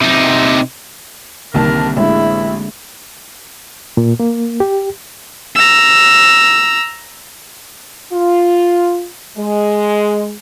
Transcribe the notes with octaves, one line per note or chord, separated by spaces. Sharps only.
C3 D#4
C2 D3 D#3 A#3 C4 A#4 A5
A1 G#3 D4 E4
A#2
A#3
G4
A#5 E6
F4
G#3